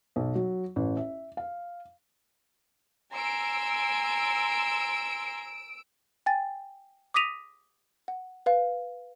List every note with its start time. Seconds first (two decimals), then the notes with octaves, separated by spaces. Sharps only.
0.16 B1
0.35 F#3
0.76 A1
0.97 E5
1.37 F5
3.14 G#5 A#5 C6 E6 D7
6.26 G5 G#5 A6
7.14 D6 D#6 A#6 B6 D#7 F7
8.08 F#5
8.46 B4 F5